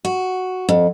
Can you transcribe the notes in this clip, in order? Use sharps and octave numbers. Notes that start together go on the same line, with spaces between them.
F#4
F2